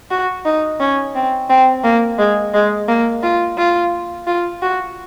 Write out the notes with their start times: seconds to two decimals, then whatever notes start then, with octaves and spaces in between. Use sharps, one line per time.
0.11 F#4
0.45 D#4
0.80 C#4
1.15 C4
1.50 C4
1.84 A#3
2.19 G#3
2.54 G#3
2.89 A#3
3.23 F4
3.58 F4
4.27 F4
4.62 F#4